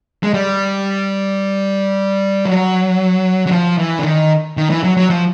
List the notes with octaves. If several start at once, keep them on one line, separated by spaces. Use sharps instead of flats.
G#3
G3
F#3
F#3
F3
E3
D3
D#3
D#3
E3
F#3
F#3
F3